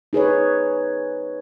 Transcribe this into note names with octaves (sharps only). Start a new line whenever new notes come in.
D#4 G#4 B4 C#5